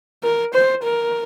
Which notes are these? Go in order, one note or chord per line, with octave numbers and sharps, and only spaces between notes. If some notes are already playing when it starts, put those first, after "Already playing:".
A#4
C5
A#4